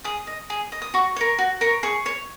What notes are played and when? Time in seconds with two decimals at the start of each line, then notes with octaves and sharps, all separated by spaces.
0.04 G#4 D#6
0.27 D#5
0.50 G#4
0.72 D#5
0.82 D#6
0.94 F#4 C#6
1.16 A#4 C#5
1.38 F#4
1.61 A#4 C#5
1.83 G#4 C#6
2.06 C#5